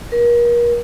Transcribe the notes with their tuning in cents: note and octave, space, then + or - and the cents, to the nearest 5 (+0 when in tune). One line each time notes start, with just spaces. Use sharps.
A#4 +40